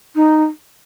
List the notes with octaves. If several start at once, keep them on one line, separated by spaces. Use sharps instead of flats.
D#4